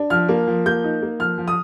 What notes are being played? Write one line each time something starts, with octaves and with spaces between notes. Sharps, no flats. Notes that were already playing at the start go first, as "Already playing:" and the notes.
Already playing: D4
F3 F6
A#3
F3
A#3 G6
D#4
A#3
F3 F6
F3
D#6